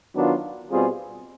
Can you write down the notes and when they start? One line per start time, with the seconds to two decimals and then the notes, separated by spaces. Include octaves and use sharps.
0.14 D#3 F#3 B3 D4 F4
0.70 B2 G3 C4 F4 G#4